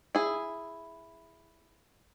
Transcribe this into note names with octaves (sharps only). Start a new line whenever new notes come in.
E4 G#4